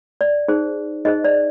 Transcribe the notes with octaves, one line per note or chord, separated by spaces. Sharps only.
D5
D#4 G#4 C5
D#4 G#4 C5 D#5
D5